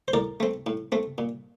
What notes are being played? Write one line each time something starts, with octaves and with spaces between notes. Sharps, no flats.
C5
A2 A#4 D5
A3 C4
A2
A3 C4
A#2